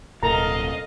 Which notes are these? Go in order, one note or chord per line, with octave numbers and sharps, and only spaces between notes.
D1 B2 A#3 A4 A#4 D#5 F5 A#5